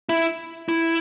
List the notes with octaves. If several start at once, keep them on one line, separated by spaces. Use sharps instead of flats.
E4
E4